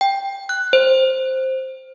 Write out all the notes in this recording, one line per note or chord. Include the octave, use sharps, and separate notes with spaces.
G5
F#6
C5